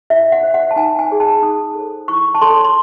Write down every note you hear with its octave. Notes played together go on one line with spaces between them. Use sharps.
E4 E5
F#5
C5
F#5
A5
D#4 G#5
G#5
G#4 C#5
A5
D#4 D#6
A4 C5
E4 C#6
A5
A4 C#5 C6
C6